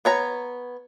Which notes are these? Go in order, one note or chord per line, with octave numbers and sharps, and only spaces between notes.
B3 C#5 A#5